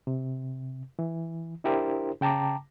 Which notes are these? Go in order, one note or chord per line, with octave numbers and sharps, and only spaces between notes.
C3
E3
D4 E4 G4 A#4 C5
C#3 G5 A5 A#5 D6